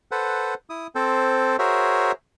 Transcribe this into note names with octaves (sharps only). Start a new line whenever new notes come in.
A4 B4 C5 F#5
E4 D#6
C4 A4 C5
F#4 G#4 A#4 C5 C#5 E5